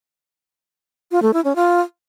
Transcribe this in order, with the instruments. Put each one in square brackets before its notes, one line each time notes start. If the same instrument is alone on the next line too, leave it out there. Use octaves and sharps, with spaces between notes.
[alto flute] F4
A3
E4
C#4
F4